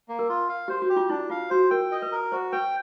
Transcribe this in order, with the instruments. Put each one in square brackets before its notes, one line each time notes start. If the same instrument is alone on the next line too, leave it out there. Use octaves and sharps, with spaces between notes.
[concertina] A#3
[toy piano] A#4
[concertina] F4
F5
[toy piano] G4 [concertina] C5
[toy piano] F#4
[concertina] G4
[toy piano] F4
[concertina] D4 [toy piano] E4
[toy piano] F4 [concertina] F5
[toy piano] F#4 [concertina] C5
[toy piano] A#4 [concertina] G5
[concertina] D#5
[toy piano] B4
[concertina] A#4
[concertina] F#4 [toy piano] C5
[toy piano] B4 [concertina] G5